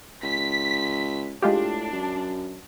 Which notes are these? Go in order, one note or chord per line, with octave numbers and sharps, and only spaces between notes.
C#2 B6
A2 G#3 D4 F4 G4
F#2